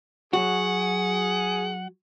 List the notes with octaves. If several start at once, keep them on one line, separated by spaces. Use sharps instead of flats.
F#3 F#4 G#4 F#5